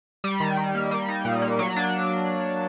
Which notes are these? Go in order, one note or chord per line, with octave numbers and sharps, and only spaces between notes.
G3
D#3
D#3
A#3
G3
D#4
A#2
A#3
F#3
D4